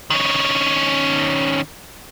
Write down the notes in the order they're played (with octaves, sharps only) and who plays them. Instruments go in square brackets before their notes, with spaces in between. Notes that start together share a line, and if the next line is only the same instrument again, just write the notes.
[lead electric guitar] D#3 C#4